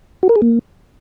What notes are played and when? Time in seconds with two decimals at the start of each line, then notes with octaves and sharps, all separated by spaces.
0.23 F#4
0.29 A#4
0.36 G#4
0.42 A#3